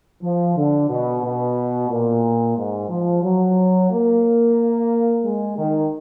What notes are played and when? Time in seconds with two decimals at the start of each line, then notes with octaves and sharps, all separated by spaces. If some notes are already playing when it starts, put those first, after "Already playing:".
0.23 F3
0.57 D3
0.89 B2
1.23 B2
1.89 A#2
2.57 G#2
2.89 F3
3.23 F#3
3.90 A#3
5.24 G#3
5.58 D#3